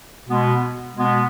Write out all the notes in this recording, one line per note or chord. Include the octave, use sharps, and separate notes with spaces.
B2 G#3 B3
B2 G#3 B3